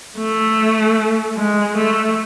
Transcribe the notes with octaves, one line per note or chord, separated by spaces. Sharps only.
A3
G#3
A3